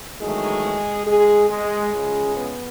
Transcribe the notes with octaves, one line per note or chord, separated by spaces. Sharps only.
E2 D#3 F#3 G#3 A3 G#4
G#3 G#4
G#3 G#4
C#2 C#3 G#3
B3